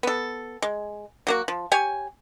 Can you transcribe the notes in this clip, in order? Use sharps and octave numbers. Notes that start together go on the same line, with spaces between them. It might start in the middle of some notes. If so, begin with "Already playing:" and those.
B3 A4
G#3
F#3 A#3 F#4
F3
G4 C#5 G#5